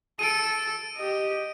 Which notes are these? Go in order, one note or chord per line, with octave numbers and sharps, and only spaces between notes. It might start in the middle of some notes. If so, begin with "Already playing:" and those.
A4 D7 D#7
G4 D#5